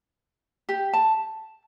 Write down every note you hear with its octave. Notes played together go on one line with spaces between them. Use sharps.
G4
A5